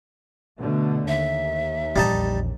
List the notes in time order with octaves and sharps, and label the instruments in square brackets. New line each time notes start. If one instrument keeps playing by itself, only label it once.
[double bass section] B2 D3 A3
[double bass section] D#2 [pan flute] E5
[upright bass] A#1 E2 [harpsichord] G3 D#4 A5